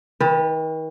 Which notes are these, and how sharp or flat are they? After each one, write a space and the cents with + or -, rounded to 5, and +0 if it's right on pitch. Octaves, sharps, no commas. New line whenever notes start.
D#3 +40 B4 +0